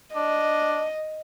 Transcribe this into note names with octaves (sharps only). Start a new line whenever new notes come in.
D4 D#5